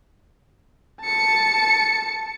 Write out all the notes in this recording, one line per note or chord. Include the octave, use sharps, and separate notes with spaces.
A5 C#7